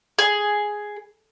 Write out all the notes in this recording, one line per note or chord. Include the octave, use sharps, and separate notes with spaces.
G#4